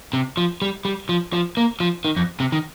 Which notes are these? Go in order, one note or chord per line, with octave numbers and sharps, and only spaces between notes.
C3
F3
G3
G3
F3
F3
A#3
F3
D#3
F2
C3
D#3